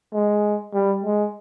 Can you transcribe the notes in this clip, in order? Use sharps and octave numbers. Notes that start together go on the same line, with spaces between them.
G#3
G3
G#3